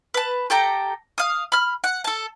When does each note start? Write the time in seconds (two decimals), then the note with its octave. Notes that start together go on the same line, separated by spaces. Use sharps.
0.14 B4 A5
0.50 G4 A4 G5 A#5
1.18 F5 D#6
1.52 B5 F6
1.84 F#5
2.04 A4 A5